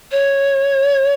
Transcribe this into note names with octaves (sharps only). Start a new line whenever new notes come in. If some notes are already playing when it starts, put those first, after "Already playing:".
C#5